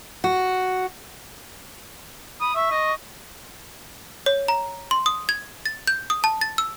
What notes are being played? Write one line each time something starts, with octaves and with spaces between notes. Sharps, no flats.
F#4
B5 D#6
E5 C#6
D#5
C#5
A#5
C6
D#6
G#6
A6
G6
D#6
A5
A6
E6